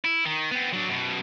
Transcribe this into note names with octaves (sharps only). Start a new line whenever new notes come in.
E4
D#3
B3 C4
F#3 D4
F#2 B2